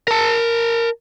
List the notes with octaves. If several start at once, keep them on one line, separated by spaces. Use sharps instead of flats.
A#4 A5